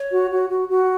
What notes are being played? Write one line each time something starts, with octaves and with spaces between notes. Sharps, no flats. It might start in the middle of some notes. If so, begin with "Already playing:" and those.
Already playing: C#5
F#4
F#4
F#4
F#4